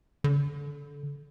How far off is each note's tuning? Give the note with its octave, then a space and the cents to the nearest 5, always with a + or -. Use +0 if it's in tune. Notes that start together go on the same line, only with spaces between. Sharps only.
D3 -25